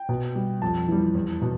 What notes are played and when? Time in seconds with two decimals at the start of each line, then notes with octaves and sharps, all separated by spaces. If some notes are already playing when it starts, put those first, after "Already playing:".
Already playing: G5
0.09 B2
0.35 G3
0.62 F2 A5
0.88 E3 G3
1.15 E2
1.42 B2